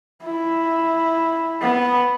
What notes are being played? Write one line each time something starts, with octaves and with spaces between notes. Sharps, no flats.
E4
B3